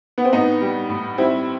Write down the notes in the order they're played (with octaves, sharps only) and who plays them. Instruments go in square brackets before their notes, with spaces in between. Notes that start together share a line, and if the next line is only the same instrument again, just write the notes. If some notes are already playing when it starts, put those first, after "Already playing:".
[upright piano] B3
C4
A2 B3 D#4
G3
A2
G3 C4 E4